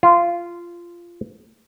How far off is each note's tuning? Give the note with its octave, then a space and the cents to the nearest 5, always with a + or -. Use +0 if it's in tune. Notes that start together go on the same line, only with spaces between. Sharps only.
F4 -15